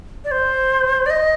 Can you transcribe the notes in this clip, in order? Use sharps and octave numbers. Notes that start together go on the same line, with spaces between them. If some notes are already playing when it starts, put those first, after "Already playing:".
D5
C5
D5
D#5